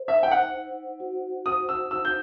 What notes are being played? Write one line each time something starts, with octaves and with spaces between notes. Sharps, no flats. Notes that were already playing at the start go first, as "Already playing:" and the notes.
Already playing: C5
D#4 E5
G5
F#5
F#5
F#4
C5 D#6
E6
D#4 E6
G6